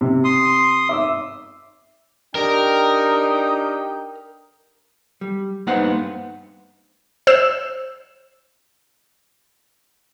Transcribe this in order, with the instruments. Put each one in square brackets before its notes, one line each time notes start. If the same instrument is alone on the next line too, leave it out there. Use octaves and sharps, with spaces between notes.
[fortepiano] C3
[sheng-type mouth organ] C6 D#6
[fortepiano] E5 D6 E6
[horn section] D4 G4 G5 [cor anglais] D#4 [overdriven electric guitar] A#4
[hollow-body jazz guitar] G3
G2 A#3 B3 D#4 C5 F#5
[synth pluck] C5 E6 E7